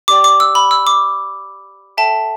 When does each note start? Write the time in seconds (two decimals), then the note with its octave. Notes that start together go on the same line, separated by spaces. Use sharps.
0.08 G4 D5 G5 D6
0.24 D6
0.40 E6
0.55 B5
0.71 E6
0.87 D6
1.97 A4 E5 G5 A5